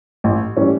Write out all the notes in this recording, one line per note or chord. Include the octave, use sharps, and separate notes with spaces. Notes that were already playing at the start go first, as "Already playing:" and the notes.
A1
A2 E3 G3 C#4